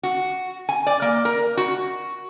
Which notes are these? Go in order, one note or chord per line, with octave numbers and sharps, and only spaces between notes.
F#4
G#5
D5
A#3
A#4
F#4